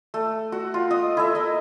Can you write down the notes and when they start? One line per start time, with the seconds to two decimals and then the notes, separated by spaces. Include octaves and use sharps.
0.14 A3
0.52 F#4
0.74 F4
0.91 D#5 D#6
1.17 E4 A4 E5
1.35 A#4 D#5